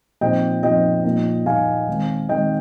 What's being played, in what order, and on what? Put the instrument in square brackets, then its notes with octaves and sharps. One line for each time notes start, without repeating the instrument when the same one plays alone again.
[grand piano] A#2 F3 C4 D#4 D#5 G5
A#2 F3 C4 D#4 D#5 G5
A#2 F3 A#3 D#4
A#2 F3 A#3 D#4 F5 G#5
D#3 G#3 C4
D#3 G#3 C4 D#5 G5